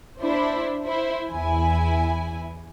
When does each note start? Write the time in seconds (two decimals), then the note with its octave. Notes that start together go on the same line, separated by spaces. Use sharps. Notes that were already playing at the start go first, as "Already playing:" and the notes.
0.21 D4 E4 C5
0.85 E4 C5
1.30 E2 E4 G#5